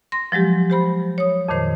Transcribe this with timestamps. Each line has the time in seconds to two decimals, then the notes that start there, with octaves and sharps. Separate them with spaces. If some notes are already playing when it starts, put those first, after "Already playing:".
0.12 C6 A#6
0.32 F3 F#3 G#3 G4
0.70 G4 C5 B5
1.18 C#5 D#6
1.49 F2 A#2 D#3 C5